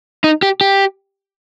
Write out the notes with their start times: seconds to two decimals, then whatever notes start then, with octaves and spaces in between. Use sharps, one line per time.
0.24 D#4
0.42 G4
0.61 G4